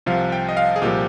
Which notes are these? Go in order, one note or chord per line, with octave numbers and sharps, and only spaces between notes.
C2 C3 F3 F5
G5
D#5
F5
G#4
C2 A#2 F3 G4